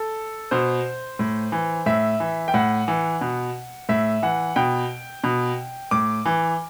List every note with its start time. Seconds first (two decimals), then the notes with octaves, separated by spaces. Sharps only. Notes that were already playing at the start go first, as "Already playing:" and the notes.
Already playing: A4
0.51 B2 C5
1.19 A2
1.52 E3
1.86 A2 E5
2.20 E3
2.48 G5
2.54 A2 F#5
2.88 E3
3.21 B2
3.89 A2 E5
4.23 E3 F#5
4.56 B2 G5
5.24 B2
5.91 A2 D6
6.26 E3